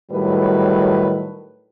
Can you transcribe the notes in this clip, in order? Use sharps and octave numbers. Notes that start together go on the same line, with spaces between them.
A2 D#3 F#3 G3 B4